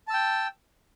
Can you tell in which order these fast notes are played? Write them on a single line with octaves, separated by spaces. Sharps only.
A5 E6 G5